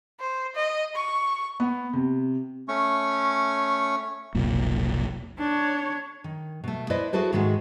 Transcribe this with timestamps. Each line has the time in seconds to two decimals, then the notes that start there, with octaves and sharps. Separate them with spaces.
0.20 C5
0.55 D#5
0.95 C#6
1.60 B3
1.93 C3
2.68 A3 C#4 C#6
4.35 F1 B1 A#2
5.38 D4 C#5
6.24 D#3
6.64 B2 A3
6.90 E4 B4 C5 D5 D#5
7.13 E4 F#4 G#4 A4 B4 C5
7.32 G#2 D#3 G#3 A3 F#4